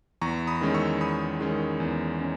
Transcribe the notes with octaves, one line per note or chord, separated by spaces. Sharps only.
E2 A#5 C#6
B5 D#6
D#3 G#3 C#4
C#6 E6
E2 B5 D#6
D#3 G#3 C#4
E2
C#4